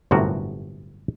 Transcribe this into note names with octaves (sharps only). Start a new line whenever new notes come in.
G1 F#2 A2 C3 F#4 A#4